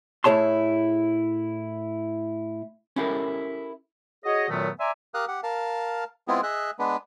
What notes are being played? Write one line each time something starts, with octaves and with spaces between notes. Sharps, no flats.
A2 E4 G#4 C#5 A5 C6
C#4 E4 G4 A4 A#4
F#4 G#4 C#5 D#5
F#2 A#2 D#3 F#3 A3 B3
D5 E5 G#5 A#5 C6 D6
G4 A#4 F5 D#6 F#6
G4 F#5
A#4 F5 A5
G#3 B3 C4 E4 F4 G#4
G#4 D#5 E5 F#6
G#3 B3 D4 B4